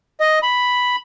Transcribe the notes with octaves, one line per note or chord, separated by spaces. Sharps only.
D#5
B5